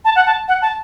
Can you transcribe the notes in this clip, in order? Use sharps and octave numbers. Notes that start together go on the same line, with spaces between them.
A5
F#5
A5
F#5
A5